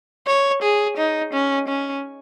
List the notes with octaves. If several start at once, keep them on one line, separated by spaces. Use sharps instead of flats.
C#5
G#4
D#4
C#4
C#4